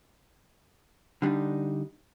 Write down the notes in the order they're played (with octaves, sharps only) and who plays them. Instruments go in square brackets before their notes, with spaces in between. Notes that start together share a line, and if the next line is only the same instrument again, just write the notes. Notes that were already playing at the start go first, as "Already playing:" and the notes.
[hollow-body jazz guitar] D3 G3 D4 D#4